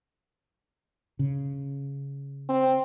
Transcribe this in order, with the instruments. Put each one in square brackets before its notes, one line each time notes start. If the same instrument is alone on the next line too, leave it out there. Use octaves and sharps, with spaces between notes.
[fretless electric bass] C#3
[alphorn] C4